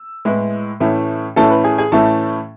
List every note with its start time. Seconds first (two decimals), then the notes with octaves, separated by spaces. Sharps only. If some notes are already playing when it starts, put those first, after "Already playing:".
Already playing: E6
0.25 A2 G#3 B3 E4
0.80 A2 E3 A3 C#4 E4
1.36 A2 E3 A3 C#4 E4 A4 A5
1.50 B4 B5
1.64 G#4 G#5
1.78 G#4 G#5
1.92 A2 E3 A3 C#4 E4 A4 A5